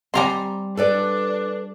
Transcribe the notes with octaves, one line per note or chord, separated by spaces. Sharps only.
G3 C4 G4 G#5 A#5 C6
D4 A4 B4 D5